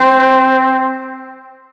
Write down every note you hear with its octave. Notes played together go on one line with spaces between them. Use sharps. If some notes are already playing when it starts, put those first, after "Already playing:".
Already playing: C4 C5